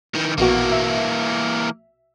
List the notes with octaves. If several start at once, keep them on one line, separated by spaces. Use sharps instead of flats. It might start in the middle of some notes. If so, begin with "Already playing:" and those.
D#3 E3
A#1 B2 E3 A#3 F#4
E5